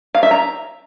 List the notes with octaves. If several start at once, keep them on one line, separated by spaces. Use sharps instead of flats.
F5
E5
A#5